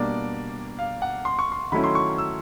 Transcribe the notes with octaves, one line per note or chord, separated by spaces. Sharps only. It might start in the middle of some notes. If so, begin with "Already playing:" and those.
Already playing: B2 G3 A#3 D4 D5
F5
F#5
C6
C#6
C6
D#3 F#3 A3 C#4 E4 B5
C6
C#6
E6